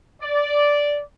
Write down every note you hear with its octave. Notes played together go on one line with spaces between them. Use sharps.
D5